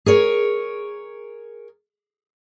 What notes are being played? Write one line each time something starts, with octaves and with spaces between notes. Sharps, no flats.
G#4 A#4 C#5